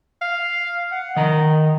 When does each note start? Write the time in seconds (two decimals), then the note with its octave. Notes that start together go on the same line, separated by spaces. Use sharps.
0.21 F5
0.91 F#5
1.16 D#3 D#5 A#5